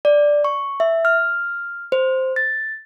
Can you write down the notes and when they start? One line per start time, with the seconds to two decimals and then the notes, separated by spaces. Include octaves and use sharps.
0.05 D5
0.45 C#6
0.80 E5
1.05 F6
1.92 C5
2.36 A6